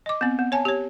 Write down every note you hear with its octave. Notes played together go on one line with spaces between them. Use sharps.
D#5 D6
B3 C4
B3
C#5 G#5 A5
G4 C#5